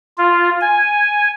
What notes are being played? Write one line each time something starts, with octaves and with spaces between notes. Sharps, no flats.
F4
G#5